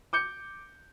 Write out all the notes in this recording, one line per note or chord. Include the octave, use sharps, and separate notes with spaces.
D6 G6 C#7